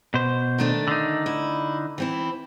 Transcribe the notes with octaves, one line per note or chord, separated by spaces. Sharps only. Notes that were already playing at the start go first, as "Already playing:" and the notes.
B2 C5
D#3 A3 D4
D3 D#4
E4
E3 C4 E4